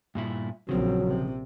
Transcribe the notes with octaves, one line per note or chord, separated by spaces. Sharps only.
G2 A#2 E4
A#1 C#3 F3 F#3 C4
C3